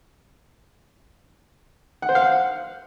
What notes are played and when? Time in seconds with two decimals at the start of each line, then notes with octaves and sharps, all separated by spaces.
2.02 F#5
2.09 C5
2.15 F5
2.22 F#5